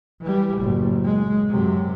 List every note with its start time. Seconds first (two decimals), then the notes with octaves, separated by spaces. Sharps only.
0.21 E3 G3
0.58 F#1 A2
1.04 G#3
1.50 F#2 C3